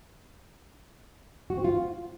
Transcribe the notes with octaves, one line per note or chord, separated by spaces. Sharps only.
F#4
C4
F4